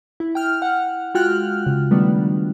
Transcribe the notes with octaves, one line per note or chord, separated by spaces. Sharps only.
E4
G5 F6
F#5
G#3 F4 F#4 G5 F6 F#6
C#3
D#3 G3 A3 B3 D4